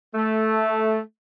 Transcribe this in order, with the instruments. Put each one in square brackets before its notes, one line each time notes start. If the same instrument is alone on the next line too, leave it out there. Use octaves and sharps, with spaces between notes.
[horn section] A3